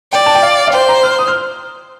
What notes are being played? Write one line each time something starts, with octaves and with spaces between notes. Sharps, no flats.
D5 G5
A5
G5
F5
F5
C5 G5
A#5
F6
D#6
F6